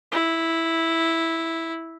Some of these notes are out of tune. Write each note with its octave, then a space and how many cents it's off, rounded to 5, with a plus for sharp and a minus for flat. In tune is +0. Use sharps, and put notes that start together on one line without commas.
E4 -5